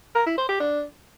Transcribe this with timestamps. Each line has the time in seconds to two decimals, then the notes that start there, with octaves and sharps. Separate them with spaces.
0.15 A#4
0.26 E4
0.38 C5
0.49 G4
0.60 D4